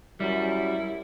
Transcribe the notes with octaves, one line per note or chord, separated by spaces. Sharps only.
F#2 G3 E4